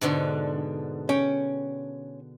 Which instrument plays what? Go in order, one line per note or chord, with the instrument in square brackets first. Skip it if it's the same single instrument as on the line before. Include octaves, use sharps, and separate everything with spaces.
[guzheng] G#2 B2 D3
[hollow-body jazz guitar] C#4 [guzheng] G5